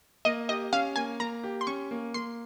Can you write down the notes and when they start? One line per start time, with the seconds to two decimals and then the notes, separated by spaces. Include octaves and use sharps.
0.25 A#3 D#5
0.49 G4 D#5
0.73 C#4 F5
0.96 A#3 G#5
1.20 A#3 A#5
1.44 G4
1.61 C6
1.67 C#4 C#6
1.91 A#3
2.14 A#3 C6